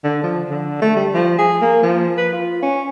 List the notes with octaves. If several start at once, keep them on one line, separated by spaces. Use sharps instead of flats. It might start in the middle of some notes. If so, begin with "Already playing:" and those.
D3
F3
D3
A3
G3
F3
G#4
A#3
F3
B4
F4
C#4